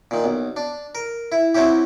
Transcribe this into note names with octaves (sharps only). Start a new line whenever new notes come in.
A#2 D#3
B1
D4
A#4
E4
F#3 C4 C#4 E4 G4